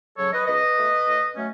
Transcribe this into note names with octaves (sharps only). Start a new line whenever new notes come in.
C#3 F#3 A4 C#5
B4 D#5
C#2 B4 D#5
B2 A3
A2
F#3 A3 C#4